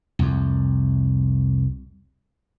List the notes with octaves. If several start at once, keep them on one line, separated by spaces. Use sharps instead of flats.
C2 F2